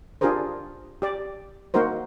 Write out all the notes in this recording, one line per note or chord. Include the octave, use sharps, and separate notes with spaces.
D4 F4 G4 G#4 A#4 C5
G4 D5
A#3 D#4 F#4 A#4 C5